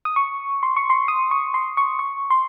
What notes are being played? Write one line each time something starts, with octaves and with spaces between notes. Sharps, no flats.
D#6
C#6
C6
C#6
C6
D#6
C#6
C6
C#6
C#6
C6